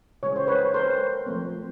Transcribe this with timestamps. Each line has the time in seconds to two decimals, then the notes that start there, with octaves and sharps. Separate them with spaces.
0.23 C#3 E3 G#3 C#4 C#5
0.36 C5
0.47 B4 C#5
0.74 A#4 C5
1.26 F3 A3 C4